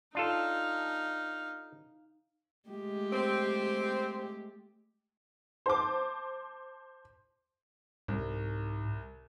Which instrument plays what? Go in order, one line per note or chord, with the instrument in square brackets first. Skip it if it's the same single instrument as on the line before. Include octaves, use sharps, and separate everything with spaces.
[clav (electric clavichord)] D4 F4 A4 [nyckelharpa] D#4 F5
[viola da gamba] G#3 A3 G4
[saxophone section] C4
[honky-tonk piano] C5 A5 D6
[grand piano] C2 [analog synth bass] G#2